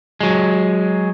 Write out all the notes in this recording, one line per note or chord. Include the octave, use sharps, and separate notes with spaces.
F#3 G#3